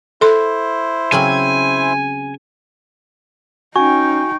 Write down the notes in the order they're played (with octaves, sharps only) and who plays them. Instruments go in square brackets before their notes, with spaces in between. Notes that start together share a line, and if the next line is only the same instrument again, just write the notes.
[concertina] E4 C5 [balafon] A4 C6
[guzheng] C#3 F#3 C4 [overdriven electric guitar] G#5
[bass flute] C#4 [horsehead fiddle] D#4 G5 [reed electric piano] F#4 G#5 [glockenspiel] C#6